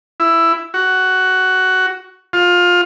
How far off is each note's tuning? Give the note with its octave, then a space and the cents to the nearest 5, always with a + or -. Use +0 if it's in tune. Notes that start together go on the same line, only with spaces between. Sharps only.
E4 +10
F#4 +10
F4 +20